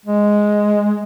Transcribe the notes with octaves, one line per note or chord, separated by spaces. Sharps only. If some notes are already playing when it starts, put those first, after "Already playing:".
G#3